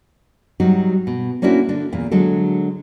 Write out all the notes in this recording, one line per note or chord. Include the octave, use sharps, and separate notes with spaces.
F#3 G3 D#4 F#4
B2
A#3 C#4 D4 E4 F#4 C5
D3 D4
E2 A#2
D3 F#3 G#3 A4